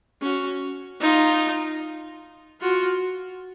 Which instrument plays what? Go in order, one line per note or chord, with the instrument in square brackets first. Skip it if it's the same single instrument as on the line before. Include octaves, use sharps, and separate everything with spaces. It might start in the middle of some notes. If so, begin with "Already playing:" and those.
[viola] C#4 [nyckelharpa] F#4
[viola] D#4 [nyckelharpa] F4
[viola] F4 [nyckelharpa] F#4